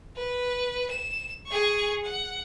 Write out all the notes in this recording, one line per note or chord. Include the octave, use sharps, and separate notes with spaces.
B4
E7
G#4 C#6
F#5